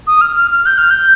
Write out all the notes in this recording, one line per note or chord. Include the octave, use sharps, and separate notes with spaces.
D#6
F6
F6
F6
G6
F6
G6